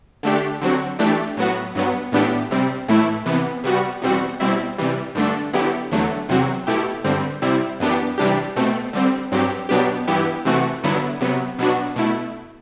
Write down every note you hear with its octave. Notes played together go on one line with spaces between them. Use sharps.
D3 A3 D4 G4
D3 F#3 C4 F#4
E3 A3 D4 G4
A2 F#3 B3 F#4
G2 F#3 B3
A2 E3 B3 D4 G4
C3 G3 C4
A2 E3 A3 E4
C3 E3 B3
C3 G3 B3 F#4
E2 B2 G3 C4 F#4
B2 G3 C4 E4
C3 E3 G3
G2 D3 A3 D4
D3 F#3 B3 E4 G4
E2 D3 F#3 A3
E2 C3 F#3 C4 F#4
B2 A3 E4 G4
G2 D3 G3 C4
C3 G3 C4 E4
F#2 E3 B3 D4 G4
C3 E3 G3 D4 G4
B2 A3 C4
D3 G3 C4
G2 F#3 C4 G4
B2 F#3 B3 D4 G4
G2 E3 B3 E4 G4
C3 E3 A3 C4 F#4
G2 D3 F#3 B3 E4
C3 F#3 B3
B2 F#3 B3 D4 F#4
B2 A3 E4